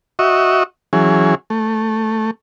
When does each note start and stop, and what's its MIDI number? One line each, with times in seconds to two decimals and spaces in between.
0.19 0.63 66
0.19 0.63 75
0.19 0.63 76
0.19 0.63 85
0.93 1.35 52
0.93 1.35 54
0.93 1.35 61
0.93 1.35 68
1.50 2.31 57